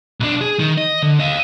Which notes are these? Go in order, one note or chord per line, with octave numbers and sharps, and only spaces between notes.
B1 D4
G#4
D#3
D#5
D3
D#5 F5